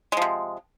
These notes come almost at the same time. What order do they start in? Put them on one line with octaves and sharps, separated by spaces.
G#3 F3 C3